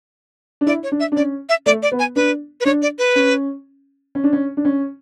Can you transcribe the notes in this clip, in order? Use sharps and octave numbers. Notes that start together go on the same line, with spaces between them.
D4
E4 D5
C#5
D4
E5
D4
C#4 D5
E5
A3 D5
D5
B3
G#5
D4 B4
B4
D4 C#5
D5
B4
C#4
C#4
D4
C#4
D4
C#4